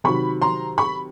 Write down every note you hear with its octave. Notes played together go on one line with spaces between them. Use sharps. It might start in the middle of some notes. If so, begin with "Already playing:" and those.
C3 D#3 F#3 B5 C#6
A#5 C6
B5 C#6